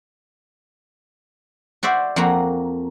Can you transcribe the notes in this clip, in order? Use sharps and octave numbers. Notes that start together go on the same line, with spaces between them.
F#4 C5 D5 E5
F2 A#3 F#4 A#5